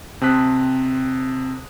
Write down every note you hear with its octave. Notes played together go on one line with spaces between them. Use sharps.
C3 C4 A5 D#6 F#6 B6